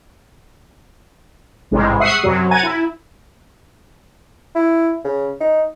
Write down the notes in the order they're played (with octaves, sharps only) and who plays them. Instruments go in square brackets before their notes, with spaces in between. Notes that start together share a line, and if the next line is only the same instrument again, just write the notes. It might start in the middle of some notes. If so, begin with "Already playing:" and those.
[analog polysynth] A1 G#2 C3 G3 G#3
E5 F#5 C#6 D#6 F#6 C7
F#2 C3 F#3
F#5 G#5 A#5 G#6 A6 D#7
E4
[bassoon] E4
C#3
D#4